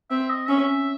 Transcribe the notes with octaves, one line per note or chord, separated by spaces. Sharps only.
C4 E5
D#5
C#4 E5